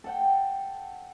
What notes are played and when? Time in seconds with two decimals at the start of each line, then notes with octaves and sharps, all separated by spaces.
0.04 A4 F#5 G5